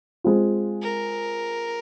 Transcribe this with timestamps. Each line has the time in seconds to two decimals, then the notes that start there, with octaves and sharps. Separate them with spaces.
0.24 G#3 C4 F4
0.82 A#4